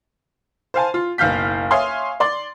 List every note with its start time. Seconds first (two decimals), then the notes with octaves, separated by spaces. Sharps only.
0.74 C5 F5 G#5 A5
0.94 F4
1.18 F#1 B1 F5 F6 G6 B6
1.71 C#5 E5 F5 G#5 C6 D#6
2.20 D5 C6